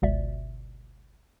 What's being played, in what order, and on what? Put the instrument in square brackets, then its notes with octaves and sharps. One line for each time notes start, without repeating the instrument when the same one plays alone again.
[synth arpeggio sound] G1 C#2 B2 D5 E5